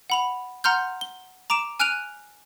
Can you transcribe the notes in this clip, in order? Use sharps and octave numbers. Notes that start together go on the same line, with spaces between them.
F#5 B5 F7
F#5 A#5 C6 F6 G6
G7
A#5 D6 D7 E7
G#5 F6 F#6 D7 D#7 F7